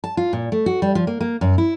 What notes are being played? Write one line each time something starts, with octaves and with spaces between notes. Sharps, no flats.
A5
F4
A#2
A3
F#4
G3
F3
A#3
A#3
F#2
E4